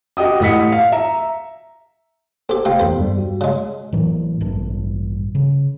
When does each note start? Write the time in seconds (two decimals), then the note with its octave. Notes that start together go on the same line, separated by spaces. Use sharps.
0.17 F#4 G4 D#5 G5 D#6
0.40 A2 D#5 F#5 D#6 B6 C#7
0.72 F5
0.92 E5 A#5
2.49 C4 G4 A4
2.65 C3 A3 F4 F5 G5
2.79 E2 A4 C5 B5
2.97 G2 G3
3.18 F#4
3.41 C#3 G#3
3.93 A2 E3 F#3
4.41 A1 G2
5.35 C#3